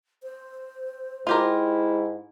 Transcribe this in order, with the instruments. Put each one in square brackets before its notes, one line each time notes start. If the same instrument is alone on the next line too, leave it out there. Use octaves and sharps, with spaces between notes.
[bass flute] C5
[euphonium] G#2 [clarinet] E4 [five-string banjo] F4 G4 A#4